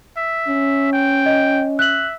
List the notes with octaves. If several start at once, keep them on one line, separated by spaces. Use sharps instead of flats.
E5
C#4
G5
D#5
E5 F#6 F#7